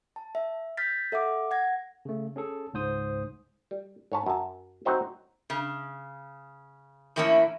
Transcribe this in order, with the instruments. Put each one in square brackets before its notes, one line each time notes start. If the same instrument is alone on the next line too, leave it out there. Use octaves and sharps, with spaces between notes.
[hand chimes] A5
E5
F6 G6 A6 B6
A4 E5 F#5 D6
F#5 G#6 A#6
[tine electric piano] C#3 A3
C#4 G#4 A4
C#2 G#2 C5 D#6
[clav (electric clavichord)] G3
G#2 C#5 A5
F#2 A5
F#3 C4 D#4 F#4 C5 E5
[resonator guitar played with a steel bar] C#3
A2 E3 A3 A#3 C#4 E4